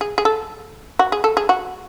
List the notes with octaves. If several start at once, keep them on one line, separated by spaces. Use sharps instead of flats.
G#4
G#4
A4
F#4
G#4
A4
G#4
F#4